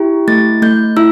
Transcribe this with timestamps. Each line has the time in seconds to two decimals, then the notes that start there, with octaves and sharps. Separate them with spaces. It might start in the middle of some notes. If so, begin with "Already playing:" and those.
Already playing: E4 G4
0.28 A3 A6
0.62 A3 G6
0.97 E4 E6